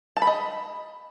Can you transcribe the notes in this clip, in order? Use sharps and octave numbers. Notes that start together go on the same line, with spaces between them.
A5
B5
D#5